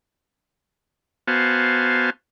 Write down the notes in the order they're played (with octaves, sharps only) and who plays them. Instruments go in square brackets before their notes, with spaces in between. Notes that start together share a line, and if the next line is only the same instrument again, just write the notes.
[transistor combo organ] B3 F#4 C5 F5 G#5 A5